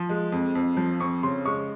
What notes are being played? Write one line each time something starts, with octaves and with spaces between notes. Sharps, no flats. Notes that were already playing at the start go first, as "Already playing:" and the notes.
Already playing: F3
G#3
F2
F2
F3
F2 C#6
C#3 C6
G#3 C#6